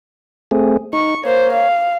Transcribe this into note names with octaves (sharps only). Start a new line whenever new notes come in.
A3 C4 G#4
D#4 C#6
A#3 C5 C#5
F5